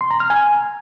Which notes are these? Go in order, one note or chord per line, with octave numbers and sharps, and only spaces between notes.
C6
A#5
F6
G#5